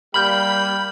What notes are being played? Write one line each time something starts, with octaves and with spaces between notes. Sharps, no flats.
G3 A#3 B5 F6 G6 F#7